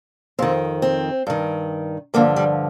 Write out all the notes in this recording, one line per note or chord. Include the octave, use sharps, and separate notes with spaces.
F2 D#3 C4
C4
G2 D#3
G2 D3 F3 A#3
G3